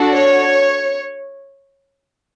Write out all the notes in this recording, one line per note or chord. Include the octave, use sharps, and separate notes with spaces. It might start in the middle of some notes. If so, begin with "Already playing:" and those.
Already playing: D4 F#4 A4
C#5